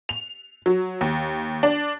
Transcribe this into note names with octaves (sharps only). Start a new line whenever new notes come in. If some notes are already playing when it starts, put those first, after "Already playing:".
F7
F#3
D#2
D4